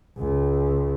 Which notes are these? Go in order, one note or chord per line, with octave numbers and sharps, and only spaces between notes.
C#2